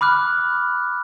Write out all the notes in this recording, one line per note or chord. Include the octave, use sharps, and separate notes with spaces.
B5 D6 F6 F#6